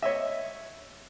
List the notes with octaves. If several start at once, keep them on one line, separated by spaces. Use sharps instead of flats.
C#5 D#5 E5